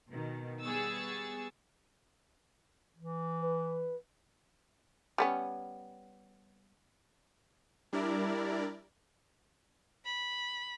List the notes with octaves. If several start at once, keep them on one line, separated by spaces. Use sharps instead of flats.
B2 D#3
G3 B3 G#4 C#6 E6 A6
E3
B4
G3 B3 C#4
G3 D4 E4 A#4 D5
B5